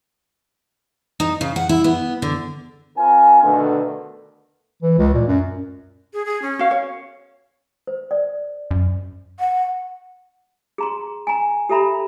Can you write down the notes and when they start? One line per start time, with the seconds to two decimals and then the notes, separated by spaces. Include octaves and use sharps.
1.20 D#4
1.41 C#3
1.56 F#5
1.69 E4
1.84 B3
2.22 D3
2.97 C4 F4 A#4 G#5
3.43 B2 D3 D#3 A3 D4 B4
4.82 E3
4.98 C#2
5.14 A#2
5.27 F#2
6.13 G#4
6.26 G#4
6.42 C#4
6.59 F#4 F5
6.71 C#5
7.87 C5
8.11 D5
8.71 F#2
9.40 F#5
10.78 G#4 A#5 C6
11.27 G#5 A#5
11.69 G4 A4 E5 A#5 B5